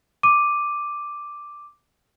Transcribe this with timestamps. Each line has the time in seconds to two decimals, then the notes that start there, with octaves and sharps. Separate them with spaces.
0.23 D6 D#7